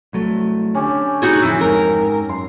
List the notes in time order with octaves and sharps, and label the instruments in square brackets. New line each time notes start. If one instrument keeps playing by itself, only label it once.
[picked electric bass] C2 F#3 A3
[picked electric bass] D3 [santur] C#4 G4
[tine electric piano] A2 [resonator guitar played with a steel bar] D#4 F#4 G#4
[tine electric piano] F2 E6 [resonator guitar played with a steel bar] E3
[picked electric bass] G#2 [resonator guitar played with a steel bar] A#4
[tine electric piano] F#2 [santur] C6